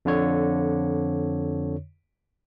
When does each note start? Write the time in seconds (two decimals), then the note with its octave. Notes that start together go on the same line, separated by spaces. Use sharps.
0.05 F2 D3 C#5